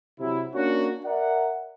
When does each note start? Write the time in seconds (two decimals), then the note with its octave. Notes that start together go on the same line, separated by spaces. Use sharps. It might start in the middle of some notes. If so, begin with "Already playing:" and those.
0.19 C3 F#3 E4
0.54 A#3 C#4 D4 F#4
1.05 A#4 D5 E5 F#5